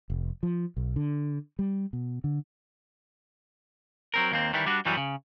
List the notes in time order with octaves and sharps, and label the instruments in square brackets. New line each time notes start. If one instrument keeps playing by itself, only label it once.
[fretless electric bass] F1
F3
B1
D3
G3
B2
D3
[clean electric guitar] F#3 C4 A#4
D#2 A#3 C4
D#3 E3 G3 E4
G3 D4 F#4
F#2 E3 F#3 G3 B3
C#3